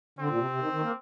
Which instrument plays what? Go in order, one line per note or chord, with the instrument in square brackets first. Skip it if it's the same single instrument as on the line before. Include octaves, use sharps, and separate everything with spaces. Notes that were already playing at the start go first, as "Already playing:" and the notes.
[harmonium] D3 [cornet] C4
[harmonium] A#2
C3
C3
D#3
D#3
A#3